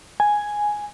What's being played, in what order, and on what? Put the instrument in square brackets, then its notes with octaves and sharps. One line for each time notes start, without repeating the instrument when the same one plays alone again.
[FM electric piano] G#5